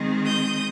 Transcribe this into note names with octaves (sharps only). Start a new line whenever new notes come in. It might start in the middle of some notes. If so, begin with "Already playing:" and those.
Already playing: D#3 G#3 C4
D#6 G6